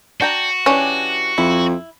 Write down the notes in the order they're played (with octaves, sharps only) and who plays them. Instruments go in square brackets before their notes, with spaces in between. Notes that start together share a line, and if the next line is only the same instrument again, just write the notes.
[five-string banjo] D4 G5 A#5 [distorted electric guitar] F#4
[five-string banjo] E3 D4 G4 [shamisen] C#4
[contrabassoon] F2 [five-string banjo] E4